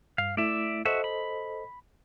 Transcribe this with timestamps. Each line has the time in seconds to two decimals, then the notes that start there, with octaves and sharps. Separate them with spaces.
0.18 G2 F5
0.37 A3 E4 D5 E5
0.85 F#4 A4 C5 D#5 E5
1.04 B5